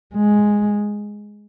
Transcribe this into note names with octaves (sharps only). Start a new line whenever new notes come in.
G#3